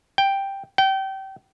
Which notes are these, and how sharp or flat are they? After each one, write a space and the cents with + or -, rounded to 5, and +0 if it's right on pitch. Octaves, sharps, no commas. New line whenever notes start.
G5 +5
G5 -25